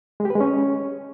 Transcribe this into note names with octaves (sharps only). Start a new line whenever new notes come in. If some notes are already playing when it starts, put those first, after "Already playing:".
G#3
G4
B4
G#3
C#4